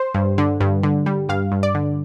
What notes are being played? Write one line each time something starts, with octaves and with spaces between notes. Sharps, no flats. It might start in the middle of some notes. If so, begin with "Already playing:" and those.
Already playing: C5
G2
D3
G2
D3
G3
G2 F5
G2
D5
D3